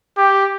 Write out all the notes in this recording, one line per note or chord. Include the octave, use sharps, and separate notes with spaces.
G4